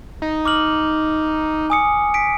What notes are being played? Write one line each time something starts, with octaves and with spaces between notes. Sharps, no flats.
D#4
D6 F6 F#7
G#5 D#6 C#7
B6 D7